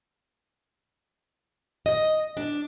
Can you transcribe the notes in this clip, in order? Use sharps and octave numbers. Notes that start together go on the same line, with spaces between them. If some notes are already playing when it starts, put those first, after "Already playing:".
D#5
D4